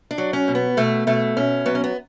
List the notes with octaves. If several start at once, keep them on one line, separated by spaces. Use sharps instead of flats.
D4
F#3
C#4
B2
B3
B2 A3
B2 A3
B2 C#4
F#3 B3
C#4
B3